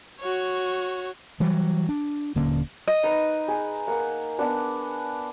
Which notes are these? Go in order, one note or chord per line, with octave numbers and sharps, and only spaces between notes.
F#4 C#5
E3 F#3 G3
D4
D#1 D3 A#3 C#4
D#5
D#4 B4
G#4
A#3 F#5
B3 D4 F#5